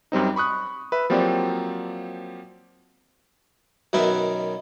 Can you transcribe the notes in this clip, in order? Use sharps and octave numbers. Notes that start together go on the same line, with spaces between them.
F#2 G3 C4 D#4
B5 C#6 D#6 F#6
B4 E5
F3 F#3 A#3 C4 G4 D5
F#2 B2 D#3 C#4 B4 E5